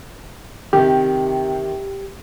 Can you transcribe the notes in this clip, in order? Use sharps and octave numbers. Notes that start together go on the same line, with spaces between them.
C3 D#3 G4